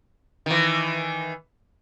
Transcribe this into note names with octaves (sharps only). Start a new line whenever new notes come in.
D#3 E3